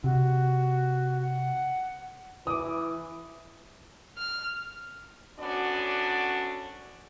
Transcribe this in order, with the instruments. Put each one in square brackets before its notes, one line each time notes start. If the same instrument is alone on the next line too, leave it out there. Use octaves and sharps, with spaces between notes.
[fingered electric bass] C3 [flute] F#4
[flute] F#5
[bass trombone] E3 [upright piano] D6 D#6
[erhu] F6
[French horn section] D2 B3 C#4 D4 F#4 D5